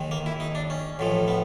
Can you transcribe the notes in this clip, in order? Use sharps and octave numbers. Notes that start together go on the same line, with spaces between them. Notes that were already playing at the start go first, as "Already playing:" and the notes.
Already playing: D#2 D#3 G#3
A#3
E4
D#4
D4
C#4
A1 A2 F3 G#3
B3